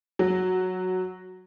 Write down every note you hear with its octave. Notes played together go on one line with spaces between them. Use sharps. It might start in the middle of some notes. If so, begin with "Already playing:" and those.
F#3